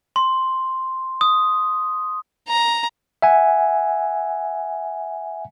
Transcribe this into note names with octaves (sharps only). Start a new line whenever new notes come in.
C6
D#6
A#5
E5 F#5 G#5